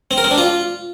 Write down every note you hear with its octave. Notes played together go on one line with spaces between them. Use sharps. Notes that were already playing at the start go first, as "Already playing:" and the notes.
C4
A#4
C4
D4
F4